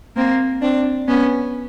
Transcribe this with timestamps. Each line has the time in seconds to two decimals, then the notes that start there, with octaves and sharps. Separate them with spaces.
0.16 A#3 C4
0.62 C4 D4
1.08 B3 C#4